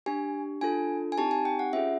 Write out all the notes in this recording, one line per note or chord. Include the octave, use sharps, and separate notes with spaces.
D4 G4 G#5
D4 F4 A4 G#5
G#5
C4 D#4 G4 A5
G#5
G5
F#5
C#4 F4 G#4 E5